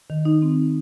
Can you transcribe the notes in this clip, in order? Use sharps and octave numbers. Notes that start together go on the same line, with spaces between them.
D#3
D#4
C4